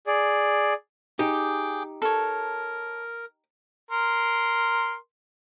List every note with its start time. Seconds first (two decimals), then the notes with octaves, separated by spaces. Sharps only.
0.07 G#4 D5
1.19 D#4 G4 G#4 G5 D6
2.02 A4 A#4 C#5
3.91 A#4 C6